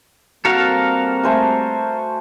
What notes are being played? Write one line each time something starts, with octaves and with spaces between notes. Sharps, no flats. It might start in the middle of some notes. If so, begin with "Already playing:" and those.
G3 A#3 C4 F#4 A4 A#4 F5
A3 C5 G#5